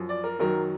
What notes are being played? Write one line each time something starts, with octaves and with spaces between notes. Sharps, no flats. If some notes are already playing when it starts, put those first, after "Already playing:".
Already playing: F#2 F3
D5
A#4
F#2 D#3 F#3 A#4